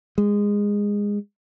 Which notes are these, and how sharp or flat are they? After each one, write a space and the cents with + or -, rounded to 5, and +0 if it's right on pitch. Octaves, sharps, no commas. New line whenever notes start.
G#3 -20